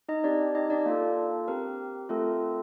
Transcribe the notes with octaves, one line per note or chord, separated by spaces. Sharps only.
D#4 D#5
C4 D4 G4 D5
D#4 D#5
D4 D5
A#3 D4 F4 A4
C4 G4 A#4
A3 C4 F4 A4